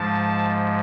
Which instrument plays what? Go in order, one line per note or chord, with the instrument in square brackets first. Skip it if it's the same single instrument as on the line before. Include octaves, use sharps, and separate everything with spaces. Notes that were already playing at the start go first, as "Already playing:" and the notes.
Already playing: [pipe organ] G#2 F3 G#3 A5